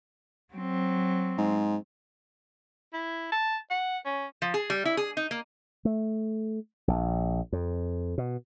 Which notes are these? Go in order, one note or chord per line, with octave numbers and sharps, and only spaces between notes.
F#3 C4
G#2
E4
A5
F#5
C#4
F3
G#4
G3
E4
G#4
D#4
A#3
A3
A#1
F2
B2